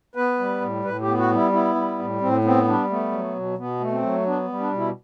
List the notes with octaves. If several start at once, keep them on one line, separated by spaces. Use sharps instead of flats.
B3 B4
G3
A2
A2 B4
G4
B3
F#4
G3 E4
B3 E4
G3
A2
A2 C4
B3 C4
G3 D4
A3 B3
F#3
B2
B2 B3
A3
C4
F#3
B3 D4
G3
D4
B2 E4